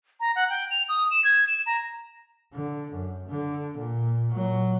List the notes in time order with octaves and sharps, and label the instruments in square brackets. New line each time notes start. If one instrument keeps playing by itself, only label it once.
[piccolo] A#5
F#5
G5
F7
D#6
E7
G#6
E7
A#5
[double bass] D3
F#2
D3
A#2
A#2 F#3